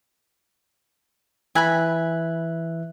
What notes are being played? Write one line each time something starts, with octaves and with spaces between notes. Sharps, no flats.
E3 E5 G#5 B5 F#6